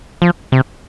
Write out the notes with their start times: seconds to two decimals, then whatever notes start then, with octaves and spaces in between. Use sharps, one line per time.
0.22 F3
0.52 C3